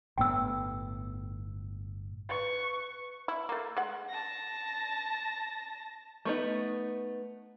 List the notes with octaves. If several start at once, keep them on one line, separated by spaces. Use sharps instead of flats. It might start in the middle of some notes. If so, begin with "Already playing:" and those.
G1 A2 B3 G5 E6
B4 C#6
E4
A3 A#3
G#3 F#5
A5 A#6
A3 B3 D#4